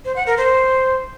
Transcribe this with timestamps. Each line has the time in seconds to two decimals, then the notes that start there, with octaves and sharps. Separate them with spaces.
0.05 C5
0.16 F#5
0.27 A#4
0.37 C5